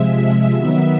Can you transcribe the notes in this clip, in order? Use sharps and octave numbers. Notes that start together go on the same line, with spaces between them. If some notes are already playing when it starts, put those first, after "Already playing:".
Already playing: C3 F3 G#3 E5
E5
D#3 F#3 B3